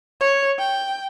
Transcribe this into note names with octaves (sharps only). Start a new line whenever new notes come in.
C#5
G5